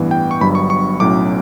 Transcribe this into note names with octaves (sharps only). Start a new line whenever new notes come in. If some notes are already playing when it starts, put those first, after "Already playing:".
Already playing: A1 G2 E3 B3
G5
C#6
G1 G2 F#3 B5
C#6
C#6
B1 A2 F#3 C#4 D6